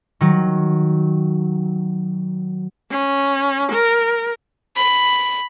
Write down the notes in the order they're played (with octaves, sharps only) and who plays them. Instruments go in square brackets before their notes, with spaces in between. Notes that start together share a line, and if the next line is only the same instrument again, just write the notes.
[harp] D#3 F#3
[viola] C#4
A#4
[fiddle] B5